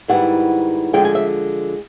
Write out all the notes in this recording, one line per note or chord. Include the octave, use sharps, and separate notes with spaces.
G#2 D#3 G3 B3 E4 F#5
D3 F3 G#3 G5
G#5
E5